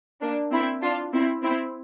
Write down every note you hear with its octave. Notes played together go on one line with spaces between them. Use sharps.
A#3 D4
C4 E4
D4 F4
C4 E4
C4 E4